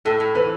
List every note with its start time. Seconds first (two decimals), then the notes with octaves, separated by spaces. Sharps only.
0.05 A2 A4
0.20 A2
0.35 E3 B4